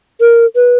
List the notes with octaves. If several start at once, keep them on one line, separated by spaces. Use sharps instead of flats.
A#4
B4